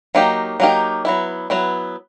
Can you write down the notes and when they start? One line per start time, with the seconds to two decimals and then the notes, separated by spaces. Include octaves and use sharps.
0.15 F#3 A#3 D#4 G4
0.60 F#3 A#3 D#4 G4
1.05 F#3 B3 E4
1.50 F#3 B3 E4